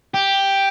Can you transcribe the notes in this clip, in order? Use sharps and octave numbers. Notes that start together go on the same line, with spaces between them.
G4